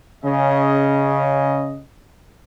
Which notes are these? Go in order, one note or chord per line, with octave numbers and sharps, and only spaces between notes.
C#3 C#4 D#5